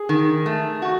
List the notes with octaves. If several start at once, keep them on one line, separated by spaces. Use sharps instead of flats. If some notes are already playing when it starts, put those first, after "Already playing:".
Already playing: G#4
D#3
A3
F#4